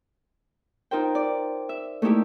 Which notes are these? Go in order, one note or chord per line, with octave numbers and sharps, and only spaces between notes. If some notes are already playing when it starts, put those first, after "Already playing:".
D#4 F4 A#4 C5 G5
D5
E5
A3 A#3 D#4 E4 G4